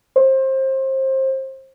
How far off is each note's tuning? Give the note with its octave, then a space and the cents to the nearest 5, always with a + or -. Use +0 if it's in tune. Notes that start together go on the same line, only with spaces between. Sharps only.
C5 +25